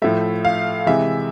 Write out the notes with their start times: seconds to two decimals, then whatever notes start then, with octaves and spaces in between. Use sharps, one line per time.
0.02 A2 F3 A3 E5
0.45 F5
0.87 C3 E3 G#3 E5